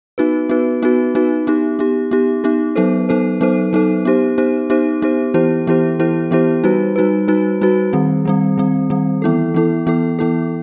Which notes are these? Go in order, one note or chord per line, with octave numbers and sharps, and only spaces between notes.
B3 D#4 F#4 B4
B3 D#4 F#4 B4
B3 D#4 F#4 B4
B3 D#4 F#4 B4
B3 D#4 G4
B3 D#4 G4
B3 D#4 G4
B3 D#4 G4
F#3 B3 D#4 A4 C5
F#3 B3 D#4 A4 C5
F#3 B3 D#4 A4 C5
F#3 B3 D#4 A4 C5
B3 D#4 G4 C5
B3 D#4 G4 C5
B3 D#4 G4 C5
B3 D#4 G4 C5
E3 B3 E4 G4 C5
E3 B3 E4 G4 C5
E3 B3 E4 G4 C5
E3 B3 E4 G4 C5
G3 D#4 F#4 B4
G3 D#4 F#4 B4
G3 D#4 F#4 B4
G3 D#4 F#4 B4
D#3 G3 C4
D#3 G3 C4
D#3 G3 C4
D#3 G3 C4
E3 B3 E4 A4
E3 B3 E4 A4
E3 B3 E4 A4
E3 B3 E4 A4